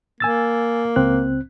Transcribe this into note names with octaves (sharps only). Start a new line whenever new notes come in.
A#3 G#5 E6 A6
C#2 C4 F#6